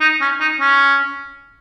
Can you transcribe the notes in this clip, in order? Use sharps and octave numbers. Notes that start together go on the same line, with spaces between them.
D#4
C#4
D#4
C#4